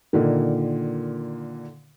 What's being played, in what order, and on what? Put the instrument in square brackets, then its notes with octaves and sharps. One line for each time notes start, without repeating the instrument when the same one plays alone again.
[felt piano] A#2 D3 D#3